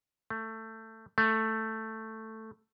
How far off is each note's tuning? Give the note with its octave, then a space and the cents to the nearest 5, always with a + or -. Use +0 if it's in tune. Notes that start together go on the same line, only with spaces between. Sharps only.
A3 +15
A3 +5